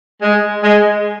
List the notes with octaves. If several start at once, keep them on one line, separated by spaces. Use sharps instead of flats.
G#3
G#3